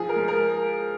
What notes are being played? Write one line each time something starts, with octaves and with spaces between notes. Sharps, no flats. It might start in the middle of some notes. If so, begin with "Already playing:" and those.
Already playing: F3 G#4
A#4
G#3
A#4